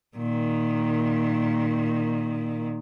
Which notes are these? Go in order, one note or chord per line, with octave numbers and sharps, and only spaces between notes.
A#2 D#3